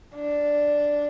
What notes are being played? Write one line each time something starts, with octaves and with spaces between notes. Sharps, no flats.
D4